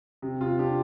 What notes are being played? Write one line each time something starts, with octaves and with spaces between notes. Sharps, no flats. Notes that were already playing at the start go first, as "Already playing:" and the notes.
C3
C3 F4
D4 G4